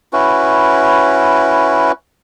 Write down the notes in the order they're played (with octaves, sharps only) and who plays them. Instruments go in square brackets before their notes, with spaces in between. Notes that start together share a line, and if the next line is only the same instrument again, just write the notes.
[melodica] C#4 E4 F#4 B4